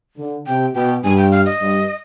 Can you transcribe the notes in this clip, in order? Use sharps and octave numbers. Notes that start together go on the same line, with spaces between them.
D3
C3 G5
B2 G5
G2 G#5
G5
F5
D#5
G2